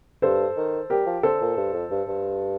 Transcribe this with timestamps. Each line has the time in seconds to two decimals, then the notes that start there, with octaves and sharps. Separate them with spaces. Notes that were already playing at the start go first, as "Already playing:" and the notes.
0.22 G2 A4 C5
0.57 D#3
0.90 G3 G4 A#4
1.06 F3
1.23 D3 A4 C5
1.41 A#2
1.57 G2
1.73 F2
1.91 G2
2.08 G2